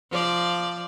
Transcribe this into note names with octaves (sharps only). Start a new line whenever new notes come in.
F3 D5